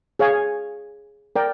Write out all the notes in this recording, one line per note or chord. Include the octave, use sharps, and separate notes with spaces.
G#4 C#5 F5 G#5
A#4 D5 G5